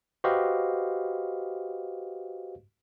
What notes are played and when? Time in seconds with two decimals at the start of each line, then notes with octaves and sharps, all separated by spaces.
0.24 F#4 G4 B4 C5 D#5 F5